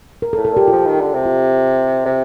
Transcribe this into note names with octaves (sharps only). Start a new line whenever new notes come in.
A#4
A4
A2
A4
A#2 G4
F3 F4
D#3
D3
C3
F4
C3